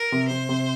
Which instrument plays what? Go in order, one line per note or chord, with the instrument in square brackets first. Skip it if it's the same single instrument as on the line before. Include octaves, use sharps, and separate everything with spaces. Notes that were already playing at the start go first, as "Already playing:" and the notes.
Already playing: [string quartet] A#4
[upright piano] C3
[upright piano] C3 [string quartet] C5
[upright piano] C3